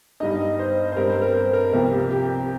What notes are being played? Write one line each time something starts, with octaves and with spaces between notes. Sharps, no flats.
G2 G3 D#4 D#5
C5
C5
G2 G3 C4 A#4
C5
A#4
C5
A#4
C2 C3 F3 C4 A#4
G4
G4